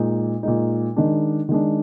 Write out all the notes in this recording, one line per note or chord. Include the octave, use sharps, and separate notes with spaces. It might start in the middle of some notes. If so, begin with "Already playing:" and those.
Already playing: A#2 G#3 D#4
A#2 G#3 D#4
D#3 G#3 D4
D#3 G#3 D4